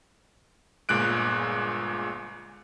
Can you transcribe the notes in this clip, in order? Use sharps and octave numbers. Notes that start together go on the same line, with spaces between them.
G1 A#2 G#3 F#6 D7